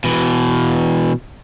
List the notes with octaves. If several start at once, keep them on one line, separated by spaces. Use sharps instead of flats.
B2 E3